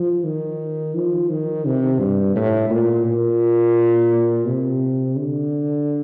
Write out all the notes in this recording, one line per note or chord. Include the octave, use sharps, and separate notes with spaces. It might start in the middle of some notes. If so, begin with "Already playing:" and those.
Already playing: F3
D#3
F3
D#3
C3
G2
A2
A#2
A#2
C3
D3